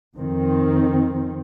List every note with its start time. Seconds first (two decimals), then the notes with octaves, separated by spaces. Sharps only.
0.15 F2 D#3 C4